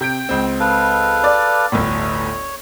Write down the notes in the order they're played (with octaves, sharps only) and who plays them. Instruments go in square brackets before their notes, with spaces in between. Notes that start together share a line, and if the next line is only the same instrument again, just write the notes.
[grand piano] C3 G6 D7 [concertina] G5
[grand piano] C#2 C4
[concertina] A4 B4 F5
[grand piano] D5
[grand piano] G1 D2 A2 [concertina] C#5